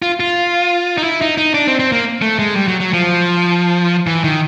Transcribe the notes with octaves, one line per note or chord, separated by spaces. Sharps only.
F4
F4
D#4
E4
D#4
D#4
D4
C4
C4
A#3
A3
G#3
G3
F#3
F#3
F3
E3
D#3